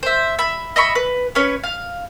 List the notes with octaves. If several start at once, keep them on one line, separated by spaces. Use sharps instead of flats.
C5 E5
E5 B5
D#5 E5 B5 C#6
B4
C#4 B4 C#5
F5